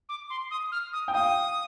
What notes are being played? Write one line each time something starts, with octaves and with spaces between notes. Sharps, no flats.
D6
C6
D#6
F6
D#6
G5
F5 D#6